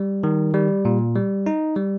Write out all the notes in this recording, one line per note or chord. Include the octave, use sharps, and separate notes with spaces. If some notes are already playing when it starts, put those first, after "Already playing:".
Already playing: G3
D#3
G3
A#2
G3
D#4
G3